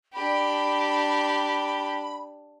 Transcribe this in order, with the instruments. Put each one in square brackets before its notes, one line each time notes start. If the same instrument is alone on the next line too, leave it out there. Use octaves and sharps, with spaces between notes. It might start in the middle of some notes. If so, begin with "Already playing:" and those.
[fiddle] D4 G4 [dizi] B5